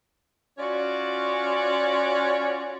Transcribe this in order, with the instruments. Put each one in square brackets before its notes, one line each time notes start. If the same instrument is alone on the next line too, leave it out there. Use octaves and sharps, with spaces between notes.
[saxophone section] C#4 F4 F#4 C#5 D5